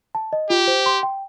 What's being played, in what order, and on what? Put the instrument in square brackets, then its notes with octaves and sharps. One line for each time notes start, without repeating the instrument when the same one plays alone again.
[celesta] A5
D#5
[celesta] F4 [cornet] G4
[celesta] C5
C6
G5